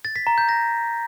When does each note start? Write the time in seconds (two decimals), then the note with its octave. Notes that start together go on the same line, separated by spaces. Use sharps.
0.05 A6
0.16 B6
0.27 A#5
0.38 G6
0.49 A#6